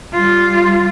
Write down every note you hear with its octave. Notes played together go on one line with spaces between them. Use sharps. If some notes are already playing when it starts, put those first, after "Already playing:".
G3 F4